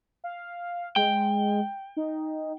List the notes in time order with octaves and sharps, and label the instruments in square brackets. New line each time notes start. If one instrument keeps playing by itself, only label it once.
[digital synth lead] F5
[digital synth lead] G#3 [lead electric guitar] G5
[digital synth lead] D#4